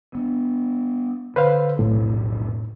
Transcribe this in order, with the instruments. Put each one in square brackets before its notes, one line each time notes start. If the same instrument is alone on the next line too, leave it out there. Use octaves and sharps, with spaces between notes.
[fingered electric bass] B3 D4
[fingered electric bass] D3 [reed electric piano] B4 C5 F5
[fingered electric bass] F1 B1 [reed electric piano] A2